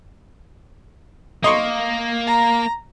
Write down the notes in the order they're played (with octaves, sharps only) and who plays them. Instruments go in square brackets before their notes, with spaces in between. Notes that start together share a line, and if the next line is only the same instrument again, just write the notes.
[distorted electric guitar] A#3 [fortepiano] D#5 C6 C#6
[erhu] A#5